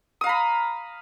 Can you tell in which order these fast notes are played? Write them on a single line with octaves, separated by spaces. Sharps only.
D#6 F5 A#5 B5